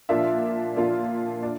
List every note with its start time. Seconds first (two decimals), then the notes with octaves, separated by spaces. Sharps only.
0.09 A#2 F3 A#3 D4 F4 E5
0.76 A#2 F3 A#3 D4 F4
1.43 D4